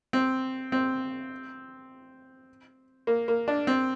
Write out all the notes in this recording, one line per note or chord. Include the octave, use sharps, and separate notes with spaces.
C4
C4
A#3
A#3
D4
C4